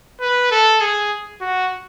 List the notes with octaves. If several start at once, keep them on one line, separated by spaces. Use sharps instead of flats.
B4
A4
G#4
F#4